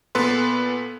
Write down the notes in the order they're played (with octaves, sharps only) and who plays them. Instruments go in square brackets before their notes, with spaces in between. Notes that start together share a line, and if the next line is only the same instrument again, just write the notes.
[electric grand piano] A#2 B3 A4 B4 C6